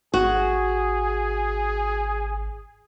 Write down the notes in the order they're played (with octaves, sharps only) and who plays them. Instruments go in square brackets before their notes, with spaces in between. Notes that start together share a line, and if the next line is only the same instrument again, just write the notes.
[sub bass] G#1 [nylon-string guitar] F#4 [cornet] G#4